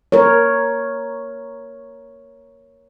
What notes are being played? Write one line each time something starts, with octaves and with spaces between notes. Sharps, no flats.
A#4 C#5